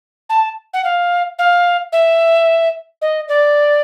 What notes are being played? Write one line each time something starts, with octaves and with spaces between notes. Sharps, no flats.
A5
F#5
F5
F5
E5
D#5
D5